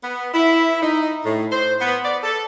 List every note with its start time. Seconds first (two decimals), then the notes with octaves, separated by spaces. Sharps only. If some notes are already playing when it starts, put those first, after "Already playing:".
0.03 B3
0.34 E4
0.82 D#4
1.25 A2
1.51 C5
1.80 B3
2.05 D5
2.23 A4